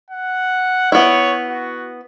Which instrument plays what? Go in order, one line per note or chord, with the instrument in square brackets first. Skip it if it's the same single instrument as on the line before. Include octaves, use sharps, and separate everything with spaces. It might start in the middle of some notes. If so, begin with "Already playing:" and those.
[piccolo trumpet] F#5
[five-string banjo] B3 E4 [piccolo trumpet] C#5
[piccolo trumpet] F#4